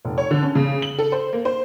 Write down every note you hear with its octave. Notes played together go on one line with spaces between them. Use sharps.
F1
C#5
D3
C#4
C#3
F#7
A4
C5
A#3
C5